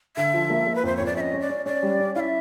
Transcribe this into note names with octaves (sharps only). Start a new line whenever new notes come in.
D3 E5
F3
A#3
A#3
B4
F2 C5
F2 C#5
D5
C#4 D#5 E5
C#4
D5
C#4
C#4 D5
G3
C#4
E4 E5 F5